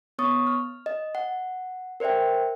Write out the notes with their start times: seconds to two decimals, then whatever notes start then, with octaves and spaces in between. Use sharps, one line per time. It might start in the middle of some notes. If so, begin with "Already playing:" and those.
0.18 B3 C#5 C#6 D#6 A6
0.47 F6
0.86 D#5
1.15 F#5
2.00 A#4 C5 D5 E5 G5